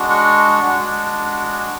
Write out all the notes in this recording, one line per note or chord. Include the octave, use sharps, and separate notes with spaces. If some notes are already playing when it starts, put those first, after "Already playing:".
Already playing: G#3 D4 F#4
C#6
G#3 D4 F#4